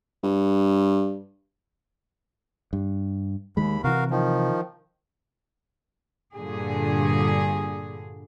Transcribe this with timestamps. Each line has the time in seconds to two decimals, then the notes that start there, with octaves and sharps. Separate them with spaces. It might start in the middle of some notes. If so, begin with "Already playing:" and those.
0.23 G2
2.73 G2
3.57 D#2 D#3 G#3 B5
3.84 C3 E3 F#4 A#4 F5
4.11 D#3 F3
6.36 G2 A#2 D3 G#4